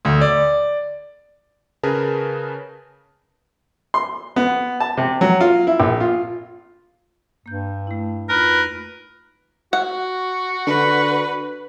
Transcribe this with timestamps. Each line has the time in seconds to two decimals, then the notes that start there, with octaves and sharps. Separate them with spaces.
0.05 D2
0.21 D5
1.83 C#3 G#4 A#4 B4 A5 F6
3.94 C6
4.36 B3
4.80 A5
4.97 C3
5.21 F#3
5.41 F4
5.67 E4
5.80 A#1
6.00 F4
7.46 G2 A#3 G6
7.87 A3 E4
8.29 F2 D#4 F4 A#4 B4
9.73 F#4 F#5
10.67 D3 B4